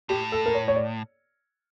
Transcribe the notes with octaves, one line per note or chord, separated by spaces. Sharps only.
A2 G4
A4
A#4
C#5
C#5
D5